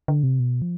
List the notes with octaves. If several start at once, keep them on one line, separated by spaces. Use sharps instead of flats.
D3
C3
B2
F3